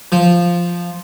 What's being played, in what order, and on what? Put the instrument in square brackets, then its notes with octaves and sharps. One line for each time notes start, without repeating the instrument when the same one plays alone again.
[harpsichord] F3